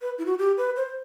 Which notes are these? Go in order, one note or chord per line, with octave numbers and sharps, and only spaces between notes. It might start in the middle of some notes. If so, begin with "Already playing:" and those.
B4
E4
F#4
G4
B4
C5